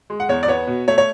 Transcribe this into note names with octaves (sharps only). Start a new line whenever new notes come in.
G#3
F#5
E2 C#5
D5
B3 C#5
B2
A3 C#5
C#5